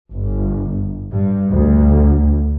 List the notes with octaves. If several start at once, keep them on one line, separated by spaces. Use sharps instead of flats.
G1
G2
D2